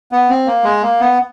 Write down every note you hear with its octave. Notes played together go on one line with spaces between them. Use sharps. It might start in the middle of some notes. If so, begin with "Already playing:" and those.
B3
C4
A#3
G#3
A#3
B3